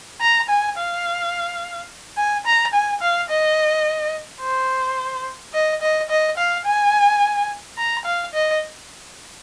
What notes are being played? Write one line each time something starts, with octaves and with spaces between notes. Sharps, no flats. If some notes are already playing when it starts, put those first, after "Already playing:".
A#5
G#5
F5
G#5
A#5
G#5
F5
D#5
C5
D#5
D#5
D#5
F5
G#5
A#5
F5
D#5